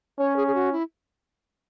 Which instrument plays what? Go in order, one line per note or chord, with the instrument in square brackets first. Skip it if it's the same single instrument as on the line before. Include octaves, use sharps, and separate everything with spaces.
[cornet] C#4 [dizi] C#5
[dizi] G#4
G#4
F#4
E4